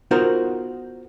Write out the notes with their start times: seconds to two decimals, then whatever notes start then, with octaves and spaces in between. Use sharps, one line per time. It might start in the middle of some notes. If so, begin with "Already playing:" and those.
0.11 B3 D#4 F4 F#4 A#4 C5